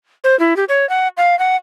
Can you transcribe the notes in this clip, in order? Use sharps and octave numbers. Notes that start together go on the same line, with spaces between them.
C5
E4
G4
C#5
F#5
F5
F#5